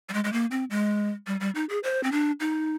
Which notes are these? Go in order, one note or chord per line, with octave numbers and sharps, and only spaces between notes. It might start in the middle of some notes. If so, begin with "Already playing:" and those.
G3
G#3
G#3
A#3
C4
G#3
G3
G3
D#4
G#4
C5
C4
D4
D#4